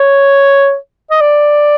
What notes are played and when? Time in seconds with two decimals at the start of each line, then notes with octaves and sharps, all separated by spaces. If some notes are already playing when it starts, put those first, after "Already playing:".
Already playing: C#5
1.11 D#5
1.21 D5